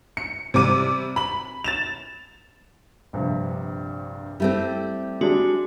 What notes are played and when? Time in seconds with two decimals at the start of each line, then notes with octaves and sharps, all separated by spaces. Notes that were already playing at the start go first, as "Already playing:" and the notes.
0.17 C#7
0.54 C3 G3 D6 D#7
1.16 B5 F#7
1.64 A6 E7 F7
3.13 A#1 G2 C3
4.40 G3 A3 C4 E4
5.21 G#3 D4 F#4 G4